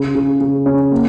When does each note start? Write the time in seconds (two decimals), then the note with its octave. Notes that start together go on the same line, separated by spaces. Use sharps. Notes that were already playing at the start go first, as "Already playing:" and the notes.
Already playing: C#3
0.15 C#3
0.40 C#3
0.66 C#4
0.91 A#3